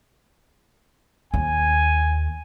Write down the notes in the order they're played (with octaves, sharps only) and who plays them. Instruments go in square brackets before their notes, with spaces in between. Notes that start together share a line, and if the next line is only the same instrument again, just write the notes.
[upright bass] D#2 [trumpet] G#5